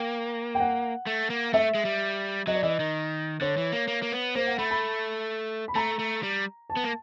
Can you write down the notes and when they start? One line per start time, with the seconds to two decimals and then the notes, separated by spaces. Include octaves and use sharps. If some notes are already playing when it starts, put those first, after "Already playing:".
Already playing: A#3 G5
0.55 G5
0.60 F#5
1.07 A3
1.30 A#3
1.53 A3 E5
1.75 G#3
1.85 G3
2.47 F#3 D#5
2.55 D5
2.63 E3 D#5
2.80 D#3
3.41 D3 C#5
3.57 E3
3.72 A#3
3.88 A#3
4.03 A#3
4.12 B3
4.35 A#3 C5
4.47 F#5
4.58 A3 B5
4.71 B5
5.68 B5
5.75 A3 A#5
5.99 A3
6.23 G3
6.70 A5
6.77 B3
6.84 A#3